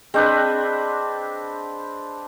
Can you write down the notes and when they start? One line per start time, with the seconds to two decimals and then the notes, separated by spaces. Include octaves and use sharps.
0.14 C4 D4 G#4 B4 D#5 G6